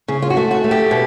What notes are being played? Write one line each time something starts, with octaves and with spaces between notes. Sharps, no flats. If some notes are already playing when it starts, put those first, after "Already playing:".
C#3 G#4
F4
F#4
A3
F#4
A3
G4
B2